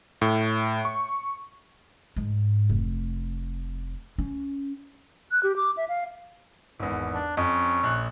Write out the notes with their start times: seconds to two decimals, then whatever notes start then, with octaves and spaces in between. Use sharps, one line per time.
0.21 A2
0.85 C#6
2.16 G#2
2.69 F1
4.18 C#4
5.32 F#6
5.43 G4
5.57 D6
5.77 E5
5.89 F5
6.80 G#1 E2
7.15 D4
7.37 F2 C#4
7.83 A#1 F#6